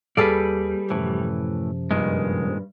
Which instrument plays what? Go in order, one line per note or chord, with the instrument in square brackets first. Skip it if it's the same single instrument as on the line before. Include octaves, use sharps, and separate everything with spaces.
[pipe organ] D#2 [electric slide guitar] G3 [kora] G#4 A4 F5 [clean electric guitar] B4 D5
[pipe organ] F#2 C3 F3 [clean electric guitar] A2 E3
[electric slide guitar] G2 [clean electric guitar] A#2 D#3 G#3